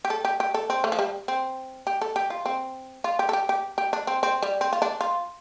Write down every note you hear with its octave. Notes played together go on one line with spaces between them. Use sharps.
G4
A4
G4
G4
A4
C4
A3
F3
G3
C4
G4
A4
G4
F4
C4
F4
G4
A4
G4
G4
G4
D4
C4
C4
G3
C4
F4
D4
F4